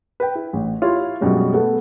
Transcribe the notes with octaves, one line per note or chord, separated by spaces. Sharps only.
B4 G5
E4
A1
E4 F4 G4 C#5
F#2 B2 G3 G#3 C#4
A3 B3 A4